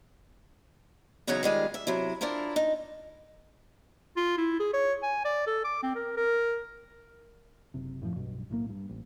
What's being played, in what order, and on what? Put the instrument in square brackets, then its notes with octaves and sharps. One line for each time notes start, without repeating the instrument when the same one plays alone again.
[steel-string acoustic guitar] E2 C#3 F#3 D#4 C#5
D#3 G3 G#3 F4
E5
C3 F#3 E4
D4 E4 F4 A#4 C5
D#4
[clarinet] F4
E4
G#4
C#5
G#5
D5
A4
D6
C4
A#4
A#4
[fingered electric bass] F#1 C3
F#2 A2 D3 F3
B1 G2 B2
B1 A2 F3 A#3
G2
A1